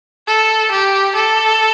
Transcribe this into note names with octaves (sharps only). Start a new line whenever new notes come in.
A4
G4
A4